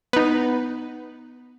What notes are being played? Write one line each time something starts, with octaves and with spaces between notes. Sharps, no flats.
B3 D#4